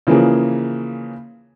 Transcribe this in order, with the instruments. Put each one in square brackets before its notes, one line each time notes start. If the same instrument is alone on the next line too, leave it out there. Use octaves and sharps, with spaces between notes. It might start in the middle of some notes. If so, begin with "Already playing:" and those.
[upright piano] C#3 E3 F3 A#3 C#4 G#4